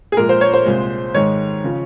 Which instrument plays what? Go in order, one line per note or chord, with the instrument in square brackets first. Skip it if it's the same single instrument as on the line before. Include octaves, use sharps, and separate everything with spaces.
[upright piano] G#4
A#2 F3 G#3 A#4
C5
C#5
C5
C2 A#2 G#3
G#2 D#3 G#3 C#5
C#3 F3